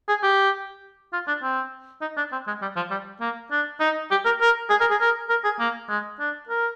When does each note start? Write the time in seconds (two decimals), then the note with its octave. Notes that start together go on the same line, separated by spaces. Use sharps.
0.08 G#4
0.23 G4
1.13 F4
1.28 D4
1.43 C4
2.01 D#4
2.17 D4
2.32 C4
2.47 G#3
2.62 G3
2.76 F3
2.91 G3
3.20 A#3
3.51 D4
3.80 D#4
4.11 G4
4.25 A#4
4.41 A#4
4.70 G#4
4.81 A#4
4.91 G#4
5.00 A#4
5.30 A#4
5.44 G#4
5.59 A#3
5.89 G#3
6.20 D4
6.49 A#4